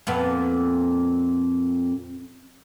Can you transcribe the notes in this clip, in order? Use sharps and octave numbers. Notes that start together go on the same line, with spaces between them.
F2 A#2 B3